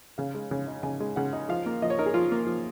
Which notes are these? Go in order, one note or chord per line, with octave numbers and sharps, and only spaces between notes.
C#3 F5
G#3
C#3
D#4
C#3 G#5
G#3
C#3 F#5
D#4
F3 F5
A#3
F3 D#5
C#5
D#4 A#4
G#4
F3 F4
A#3
F3